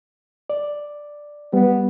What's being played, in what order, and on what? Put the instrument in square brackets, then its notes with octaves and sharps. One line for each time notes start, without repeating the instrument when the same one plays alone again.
[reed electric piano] D5
[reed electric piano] G3 [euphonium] B3